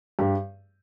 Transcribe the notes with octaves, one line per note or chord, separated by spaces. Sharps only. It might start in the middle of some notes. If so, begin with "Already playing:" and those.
G2 G4